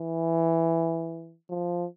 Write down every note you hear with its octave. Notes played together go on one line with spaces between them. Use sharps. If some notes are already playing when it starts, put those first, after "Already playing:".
Already playing: E3
F3